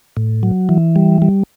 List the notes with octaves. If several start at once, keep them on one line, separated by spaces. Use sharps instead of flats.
A2
F#3
E3
G3
G3